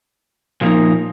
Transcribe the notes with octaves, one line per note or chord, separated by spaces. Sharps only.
A#2 F3 A#3 D#4